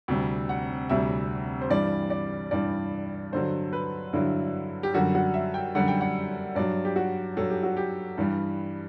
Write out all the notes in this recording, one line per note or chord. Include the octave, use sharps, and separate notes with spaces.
D2 C3 G3
F#5
D2 C3 G3 E5
C5
G2 E3 G3 D5
D5
G2 E3 G3 D5
G2 D3 F#3 C5
B4
G2 D3 F#3 E4
G4
F#2 D3 G3 F#4
F#4
E5
G5
F#2 D3 G3 F#5
G5
F#5
G2 F#3 D5
G4
F#4
G2 F#3 A4
G4
F#4
G4
G2 E3 G3